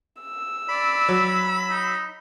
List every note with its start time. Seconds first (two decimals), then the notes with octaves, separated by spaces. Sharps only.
0.21 E6
0.69 D5 B5
1.08 F#3
1.70 D#4